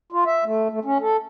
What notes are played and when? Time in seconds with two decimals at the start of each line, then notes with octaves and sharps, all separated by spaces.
0.12 F4
0.26 E5
0.45 A3
0.69 A3
0.85 C#4
1.01 A4